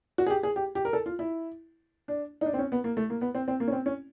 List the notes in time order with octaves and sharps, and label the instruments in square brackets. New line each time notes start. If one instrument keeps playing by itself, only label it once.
[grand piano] F#4
G#4
G4
G#4
G4
G4
A#4
A4
F4
E4
D4
D#4
D4
C4
C#4
B3
A#3
A3
A#3
B3
C4
C4
A#3
C#4
C4
C#4